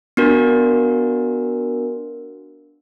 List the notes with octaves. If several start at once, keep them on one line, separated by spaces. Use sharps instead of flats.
B3 D4 F#4 A#4